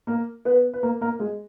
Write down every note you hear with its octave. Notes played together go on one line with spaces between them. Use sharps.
A#3 A#4
B3 B4
B4
A#3 A#4
A#3 A#4
G#3 G#4